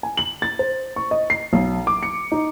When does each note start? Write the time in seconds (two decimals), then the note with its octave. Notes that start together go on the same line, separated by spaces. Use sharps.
0.03 G#5
0.17 F#7
0.42 A6
0.59 C5
0.96 C#6
1.11 D#5
1.30 C7
1.53 B1
1.87 D6
2.03 C#7
2.32 D#4